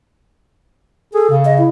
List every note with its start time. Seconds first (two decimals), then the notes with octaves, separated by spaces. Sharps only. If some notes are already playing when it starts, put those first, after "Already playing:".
1.14 G#4 A4
1.30 C#3
1.45 D#5
1.58 E4